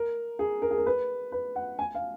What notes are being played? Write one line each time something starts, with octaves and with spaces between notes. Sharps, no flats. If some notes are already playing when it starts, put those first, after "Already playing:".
Already playing: A#4
G#4
A#4
G#4
A#4
B4
B4
F#5
G#5
F5